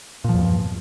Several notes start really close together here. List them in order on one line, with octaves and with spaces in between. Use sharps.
A#2 F3 E2 G2